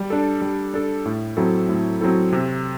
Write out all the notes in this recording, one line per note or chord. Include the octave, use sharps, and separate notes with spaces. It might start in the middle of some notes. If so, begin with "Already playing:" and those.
Already playing: G3
D4 A4
G3
D4 A4
A2
F#3 C4 E4 A4
A2
F#3 C4 E4 A4
C3